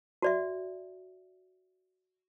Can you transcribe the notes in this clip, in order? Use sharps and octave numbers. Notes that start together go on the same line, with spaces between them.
F#4 D5 E5